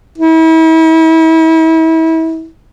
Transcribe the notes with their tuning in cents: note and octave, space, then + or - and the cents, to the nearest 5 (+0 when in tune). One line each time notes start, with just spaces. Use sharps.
E4 -35